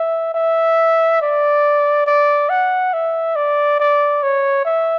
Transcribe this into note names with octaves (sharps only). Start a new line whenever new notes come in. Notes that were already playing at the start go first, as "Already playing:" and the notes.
Already playing: E5
E5
D5
D5
F#5
E5
D5
D5
C#5
E5